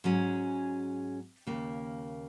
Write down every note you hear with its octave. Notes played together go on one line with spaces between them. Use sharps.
G#2 F#3 C#4 G#4
D#2 C#3 A#3